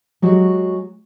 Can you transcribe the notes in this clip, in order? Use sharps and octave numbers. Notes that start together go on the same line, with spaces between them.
F#3 G#3 F#4 G4